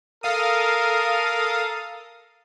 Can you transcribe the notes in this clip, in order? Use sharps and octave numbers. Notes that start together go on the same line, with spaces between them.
A4 A#4 F5 D#6